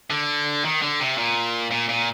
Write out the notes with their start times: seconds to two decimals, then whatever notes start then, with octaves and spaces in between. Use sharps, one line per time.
0.10 D3
0.65 D#3
0.82 D3
1.00 C3
1.18 A#2
1.71 A#2
1.89 A#2